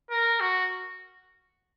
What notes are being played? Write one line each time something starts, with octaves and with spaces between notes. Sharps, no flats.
A#4
F#4